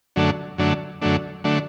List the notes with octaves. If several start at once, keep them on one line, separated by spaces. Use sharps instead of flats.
F#2 D3 F#3 A3 D4
F#2 D3 F#3 A3 D4
F#2 D3 F#3 A3 D4
D3 F#3 A3 D4